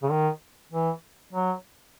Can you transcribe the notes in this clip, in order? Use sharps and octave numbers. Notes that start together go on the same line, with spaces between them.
C#3
D#3
E3
F#3